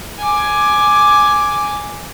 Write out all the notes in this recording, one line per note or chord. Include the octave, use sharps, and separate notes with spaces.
G#5 D6